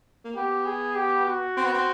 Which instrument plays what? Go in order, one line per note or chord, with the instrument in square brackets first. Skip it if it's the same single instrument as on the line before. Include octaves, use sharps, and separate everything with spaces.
[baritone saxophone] A#3
[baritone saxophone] B3 [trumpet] G4
[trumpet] G#4
G4
F#4
[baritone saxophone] C4
B3
C4